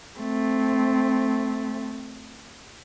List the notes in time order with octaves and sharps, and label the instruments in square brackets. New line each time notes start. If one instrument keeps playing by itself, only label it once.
[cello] A3 C4